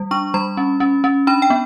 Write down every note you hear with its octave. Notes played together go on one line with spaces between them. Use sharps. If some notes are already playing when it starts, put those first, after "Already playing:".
Already playing: G3
D4 C#6
G3 B5
C#4
C#4
C#4
D4 B5
G5
B3